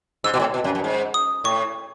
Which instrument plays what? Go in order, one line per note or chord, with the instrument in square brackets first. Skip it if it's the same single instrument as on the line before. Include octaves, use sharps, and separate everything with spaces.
[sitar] G#2 [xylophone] E6
[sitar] B2
A2
B2
F#2
F#2
G#2
[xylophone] D#6
[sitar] A2 [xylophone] C#6